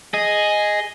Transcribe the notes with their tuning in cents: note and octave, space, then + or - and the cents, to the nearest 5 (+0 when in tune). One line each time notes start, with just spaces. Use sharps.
G#4 +0 D#5 +0